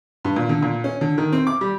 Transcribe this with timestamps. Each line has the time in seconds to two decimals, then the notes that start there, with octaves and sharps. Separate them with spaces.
0.25 G2
0.36 A#2
0.49 D3
0.63 A#2
0.84 C#4
1.01 D3
1.18 D#3
1.32 C4
1.47 D6
1.61 G3